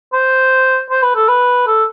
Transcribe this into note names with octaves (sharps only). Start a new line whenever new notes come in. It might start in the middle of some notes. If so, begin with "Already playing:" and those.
C5
C5
B4
A4
B4
A4